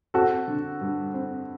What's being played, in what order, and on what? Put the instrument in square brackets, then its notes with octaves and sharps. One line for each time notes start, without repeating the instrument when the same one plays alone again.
[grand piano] C4 [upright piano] F#4 A4
[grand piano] D3
G2
C4